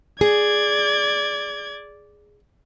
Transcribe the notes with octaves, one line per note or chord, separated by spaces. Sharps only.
G#4 D5 G#6